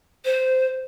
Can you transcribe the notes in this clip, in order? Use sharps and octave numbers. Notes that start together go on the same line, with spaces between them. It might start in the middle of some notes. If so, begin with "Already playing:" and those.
C5